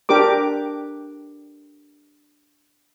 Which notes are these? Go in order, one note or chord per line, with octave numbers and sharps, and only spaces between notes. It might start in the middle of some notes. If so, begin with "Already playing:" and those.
D4 G4 A#4 D6